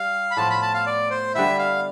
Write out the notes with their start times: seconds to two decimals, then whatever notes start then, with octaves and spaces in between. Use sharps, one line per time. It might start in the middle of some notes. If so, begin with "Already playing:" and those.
Already playing: G3 F5
0.31 B5
0.37 A2 F3 B3 F4 A5
0.50 B5
0.62 A5
0.74 F5
0.86 D5
1.10 C5
1.35 D3 G3 B3 E4 E5
1.59 F5